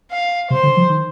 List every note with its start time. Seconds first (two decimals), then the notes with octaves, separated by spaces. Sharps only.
0.11 F5
0.50 C3 C5
0.63 D3
0.77 F3
0.90 D#3